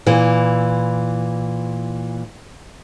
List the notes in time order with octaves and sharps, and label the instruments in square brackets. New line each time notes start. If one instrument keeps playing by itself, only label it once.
[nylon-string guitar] A#2 E3